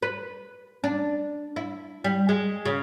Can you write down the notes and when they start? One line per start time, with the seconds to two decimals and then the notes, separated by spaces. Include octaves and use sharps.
0.02 B4
0.84 D4
1.56 E4
2.04 G3
2.29 G#3
2.65 C#3